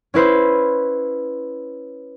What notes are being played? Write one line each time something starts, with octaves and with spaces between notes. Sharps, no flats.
C#4 E4 B4 C5